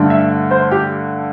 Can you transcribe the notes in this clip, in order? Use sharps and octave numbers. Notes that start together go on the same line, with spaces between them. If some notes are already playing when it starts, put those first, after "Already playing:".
Already playing: G2 D3 A3
E5
C5
G4